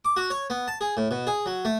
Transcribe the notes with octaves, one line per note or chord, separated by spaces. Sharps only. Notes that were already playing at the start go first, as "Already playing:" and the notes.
D6
F#4
C#5
B3
A5
G#4
A2
B2
G#4
F#3
A3